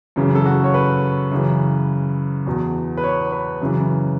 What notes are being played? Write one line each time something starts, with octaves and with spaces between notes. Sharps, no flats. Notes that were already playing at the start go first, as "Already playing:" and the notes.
F#2 C#3 E3
A4
F#4
C#5
B4
F#2 C#3 E3
E2 B2
B4
C#5
B4
F#2 C#3 E3